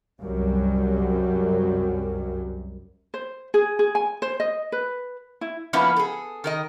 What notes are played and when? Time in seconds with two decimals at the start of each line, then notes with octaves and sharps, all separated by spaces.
0.20 C2 F#2 F#3 G3
3.14 C5
3.54 G#4
3.79 G#4
3.95 G#5
4.22 C5
4.40 D#5
4.72 B4
5.41 E4
5.73 F3 A#3 B3 C#4 E4 B4
5.96 G#4 A4
6.44 D#3 A#4 D#5